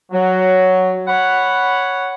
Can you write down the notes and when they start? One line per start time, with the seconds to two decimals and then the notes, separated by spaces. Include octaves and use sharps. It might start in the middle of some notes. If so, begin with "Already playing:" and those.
0.12 F#3
1.08 C#5 F#5 B5